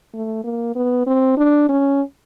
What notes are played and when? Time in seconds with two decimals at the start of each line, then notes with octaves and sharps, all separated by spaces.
0.14 A3
0.44 A#3
0.76 B3
1.07 C4
1.37 D4
1.69 C#4